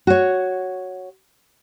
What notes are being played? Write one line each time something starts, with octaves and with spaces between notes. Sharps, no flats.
F#4 C#5